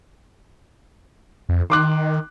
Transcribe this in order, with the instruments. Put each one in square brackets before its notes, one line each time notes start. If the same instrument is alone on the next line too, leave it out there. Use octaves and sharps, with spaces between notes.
[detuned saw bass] F2
[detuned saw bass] D#3 [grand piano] C6 D6 F#6